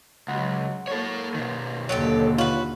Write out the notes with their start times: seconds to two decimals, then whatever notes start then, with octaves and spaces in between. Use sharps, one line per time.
0.28 C#2 F#3 F#5
0.87 A#3 A4 C#5
1.34 B2 D#3
1.89 D#2 D3 F#3 G4 A4 C#5
2.38 F4 F#4 B4 C#5 F5